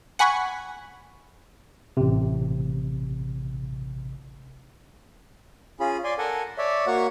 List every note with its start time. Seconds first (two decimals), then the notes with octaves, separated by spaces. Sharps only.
0.19 F#5 G#5 B5 C#6
1.97 A1 C3
5.80 C#4 F4 G#4 B5
6.04 D5 G#5 C6
6.18 A4 A#4 F#5 G#5
6.58 C#5 D5 E5
6.87 A#3 F#4 C#5 F#5 C#6